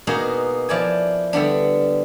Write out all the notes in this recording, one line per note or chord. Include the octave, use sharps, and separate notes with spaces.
B2 A#3 D#4 F#4 G#4
F3 E4 D5 G#5
D3 G3 B3 D4